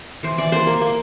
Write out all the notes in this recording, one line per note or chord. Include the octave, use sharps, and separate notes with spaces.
E3 C5
E3 D5
A#3 C5
A#3
A#3